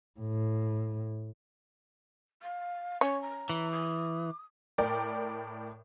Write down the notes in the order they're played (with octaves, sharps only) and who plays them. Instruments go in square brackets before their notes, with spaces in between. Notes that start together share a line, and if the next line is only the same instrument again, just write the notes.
[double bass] A2
[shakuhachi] F5
[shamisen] C#4 [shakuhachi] C#5
[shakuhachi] A#5
[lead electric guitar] E3
[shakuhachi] D#6
[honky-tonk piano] A2 A#4 D5 G5 D6